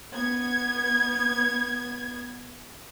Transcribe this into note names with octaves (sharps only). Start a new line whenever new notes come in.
B3 G#6